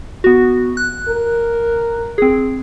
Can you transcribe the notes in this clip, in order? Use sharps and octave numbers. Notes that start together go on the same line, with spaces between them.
B3 F#4
F#6
A#4
C4 G#4